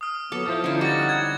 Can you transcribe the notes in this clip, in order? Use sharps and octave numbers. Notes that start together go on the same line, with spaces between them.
D#6 F6
F#3 B3 A4 D6
F3 E4 F4 C5
D3 C#4 D#4 E4
G3 F#4 D6 A6
G#6